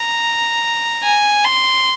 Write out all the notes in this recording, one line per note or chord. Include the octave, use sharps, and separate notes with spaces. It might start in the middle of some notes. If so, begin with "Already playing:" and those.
Already playing: A#5
G#5
C6